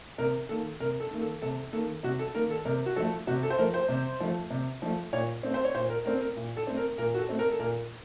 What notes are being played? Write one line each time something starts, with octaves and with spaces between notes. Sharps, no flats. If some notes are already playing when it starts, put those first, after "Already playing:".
C3 A#4
D#3 A#3 A4
C3 A#4
A4
D#3 A#3
A4
C3 A4
D#3 A#3 A4
C3 F#4
A4
D#3 A#3 A#4
A4
C3 A#4
F#4
F3 A3 A4
C3 F#4
A4
C5
F3 A3 A#4
C5
C3
F3 A3
C3
F3 A3
A#2 C#5
A3 C4
C5
C#5
A#2 C5
A#4
A3 C4 A#4
A#4
A#2
A4
A3 C4
A#4
A#2 A#4
F#4
A4
A3 C4
A#4
A4
A#2 A#4